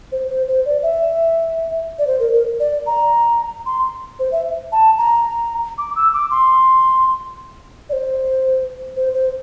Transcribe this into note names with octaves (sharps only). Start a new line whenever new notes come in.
C5
C5
C5
D5
E5
D5
C5
A#4
A#4
D5
A#5
C6
C5
E5
A5
A#5
D6
E6
D6
C6
D5
C5
C5
C5